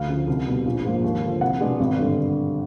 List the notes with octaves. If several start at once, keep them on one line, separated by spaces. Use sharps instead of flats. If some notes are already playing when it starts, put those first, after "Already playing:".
Already playing: D2 F5
C#3 F3
C2
B2 G3
A#1
G#2 F3 A#3
D#2
D3 F3
C2 F#5
B2 G#3 B3 D4
G#1
G2 D3 G3